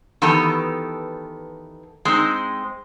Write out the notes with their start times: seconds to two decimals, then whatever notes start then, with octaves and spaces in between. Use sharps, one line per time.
0.22 D#3 E3 B3 G4 A4
2.05 G#3 C4 D#4